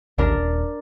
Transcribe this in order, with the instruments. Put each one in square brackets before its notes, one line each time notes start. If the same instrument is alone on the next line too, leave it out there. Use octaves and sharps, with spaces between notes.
[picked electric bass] A1 D#2 [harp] D4 A#4
[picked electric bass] D#1